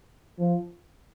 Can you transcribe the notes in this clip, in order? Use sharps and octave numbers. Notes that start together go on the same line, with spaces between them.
F3